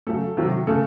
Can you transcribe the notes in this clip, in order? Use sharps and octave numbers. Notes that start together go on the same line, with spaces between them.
C#3 F#3 A3 A4
C3 D#3 F#3
C#3 A3 A4